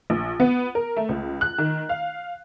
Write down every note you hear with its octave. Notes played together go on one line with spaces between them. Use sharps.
A#1
B3
A#4
A3
C#2
F#6
D#3
F5